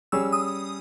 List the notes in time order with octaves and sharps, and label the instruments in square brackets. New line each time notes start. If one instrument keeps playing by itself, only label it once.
[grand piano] G3 C#4 G#4 [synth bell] E6
[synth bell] D#6